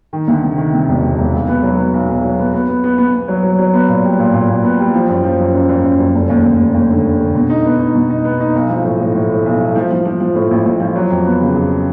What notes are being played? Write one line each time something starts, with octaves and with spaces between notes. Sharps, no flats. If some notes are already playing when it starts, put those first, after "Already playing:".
D#3
D2
C3
D#3
C3
E1
E1
E1
B1
B3
F#3
B3
B1
B1
F#3
B3
B3
B3
B3
B3
B3
F#3
F#3
F#3
B3
A#2
G3
A#2
A#2
A#2
B3
G3
F3
F#2
F3
F#2
F#2
F#2
F#2
F#2
F1
D#2
D#2
F1
D#2
D3
F1
D3
B2
D#4
B3
D#4
B2
D#4
B3
D#4
B1
F3
A2
A2
A2
A2
B1
A3
F3
F3
F3
F3
A2
A1
A1
F3
F#3
F2
B3
C#3
F2